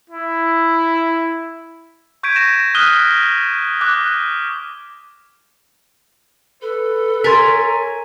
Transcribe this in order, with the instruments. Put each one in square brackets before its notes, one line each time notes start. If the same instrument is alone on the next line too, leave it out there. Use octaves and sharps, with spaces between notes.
[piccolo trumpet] E4
[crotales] C#6 G6 G#6 B6 D7 D#7
A#6 E7
D#6 F6 F#6 B6 D#7 G7
D6 F#6
[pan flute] A4 [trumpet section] B4
[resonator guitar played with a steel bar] A#4 [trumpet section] C#5 G#5 A#5 [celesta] C6 A6 B6